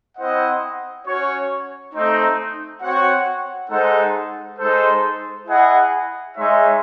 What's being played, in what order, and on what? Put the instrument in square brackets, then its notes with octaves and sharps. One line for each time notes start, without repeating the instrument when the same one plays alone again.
[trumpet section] C4 E4 C5 D#5 F#5
C#4 F#4 C#5
A3 C4 D#4
C4 F#4 C#5 F#5
G#3 D#4 A4 C5 F#5
G#3 D#4 A4 C5
E4 G#4 D#5 F#5
G#3 D#4 G#4 C#5 E5